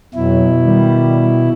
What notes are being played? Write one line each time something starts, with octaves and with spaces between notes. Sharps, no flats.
F2 B2 F#3 E4
D#3 G3